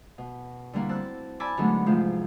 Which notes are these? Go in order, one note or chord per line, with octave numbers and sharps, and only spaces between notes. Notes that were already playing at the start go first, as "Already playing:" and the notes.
B2
D3 G3 A#3 E4
C4 A5 E6 F#6
D5 G#5 A5 B5 D6 E6
D3 F#3 G#3 A3 B3 D#4
G#2 C3 F3 G#3 A3